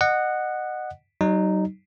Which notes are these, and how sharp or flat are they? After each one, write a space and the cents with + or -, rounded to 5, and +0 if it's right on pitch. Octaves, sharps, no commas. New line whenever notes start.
D#5 -25 F#5 +0
F#3 +45 D#4 -10